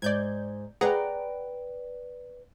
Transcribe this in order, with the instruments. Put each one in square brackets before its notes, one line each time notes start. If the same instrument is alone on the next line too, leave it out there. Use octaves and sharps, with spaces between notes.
[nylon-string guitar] G#2 [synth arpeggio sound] D5 G6 G#6
[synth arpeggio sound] G#4 F#5 A#5 [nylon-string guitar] B4 D5 G5